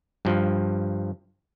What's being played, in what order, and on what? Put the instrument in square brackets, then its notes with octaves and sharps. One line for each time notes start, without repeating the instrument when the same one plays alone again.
[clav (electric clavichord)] G2 F3